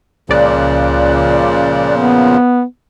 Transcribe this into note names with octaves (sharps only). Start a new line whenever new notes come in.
C#2 A#2 C#3 F3 D5 F#6
B3